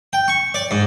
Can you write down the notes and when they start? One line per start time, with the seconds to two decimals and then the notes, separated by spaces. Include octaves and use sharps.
0.13 G5
0.28 C#6
0.54 D5
0.71 G#2